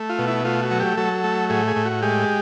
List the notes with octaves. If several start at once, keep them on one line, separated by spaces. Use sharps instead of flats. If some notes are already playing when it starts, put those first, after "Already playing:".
Already playing: A3
F4
B2
E4
A3 F4
F#4
F#3
G4
F#3 A4
A3
A2 G#4
G#4
A2
F#4
G#3 G4